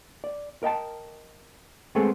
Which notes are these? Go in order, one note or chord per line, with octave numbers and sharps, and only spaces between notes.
D5
A#4 D#5 G5 A5
G#3 A3 B3 C4 G#4 A4